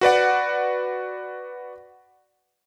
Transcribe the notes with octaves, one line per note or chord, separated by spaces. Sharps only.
F#4 B4 D5 F#5